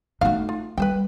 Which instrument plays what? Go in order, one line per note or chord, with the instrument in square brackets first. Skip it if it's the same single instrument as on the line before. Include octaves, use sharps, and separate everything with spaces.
[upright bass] A3 D#4 [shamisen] F#4 F5
[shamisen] F4
[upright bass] G3 [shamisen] B4 C5 G5